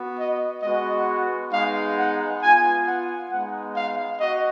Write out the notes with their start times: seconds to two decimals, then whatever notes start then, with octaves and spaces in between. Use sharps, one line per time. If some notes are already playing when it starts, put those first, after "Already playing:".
Already playing: B3 F#4
0.17 D#5
0.62 G#3 B3 F#4 D#5
1.52 G#3 B3 D#4 F5
1.96 F#5
2.41 B3 F4 G#5
2.86 F#5
3.31 G#3 B3 D#4 F#5
3.76 F5
4.20 F#4 D#5